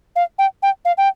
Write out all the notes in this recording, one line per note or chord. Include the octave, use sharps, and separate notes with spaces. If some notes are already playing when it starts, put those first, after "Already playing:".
F5
G5
G5
F5
G5